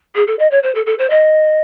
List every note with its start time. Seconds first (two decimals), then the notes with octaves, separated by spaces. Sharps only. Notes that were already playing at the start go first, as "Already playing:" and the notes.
0.15 G#4
0.27 A4
0.39 D#5
0.51 C#5
0.63 C5
0.75 A4
0.86 A4
0.99 C5
1.10 D#5